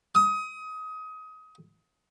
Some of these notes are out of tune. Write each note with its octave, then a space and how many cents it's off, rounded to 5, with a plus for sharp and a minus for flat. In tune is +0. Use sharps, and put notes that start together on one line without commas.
D#6 +25